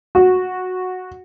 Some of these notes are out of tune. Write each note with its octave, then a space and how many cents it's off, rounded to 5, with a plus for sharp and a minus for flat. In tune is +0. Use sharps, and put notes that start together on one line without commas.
F#4 -10